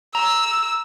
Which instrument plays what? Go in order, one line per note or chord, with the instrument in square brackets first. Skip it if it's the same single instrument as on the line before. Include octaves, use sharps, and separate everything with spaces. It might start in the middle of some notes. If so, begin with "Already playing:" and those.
[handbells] A#5 [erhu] E6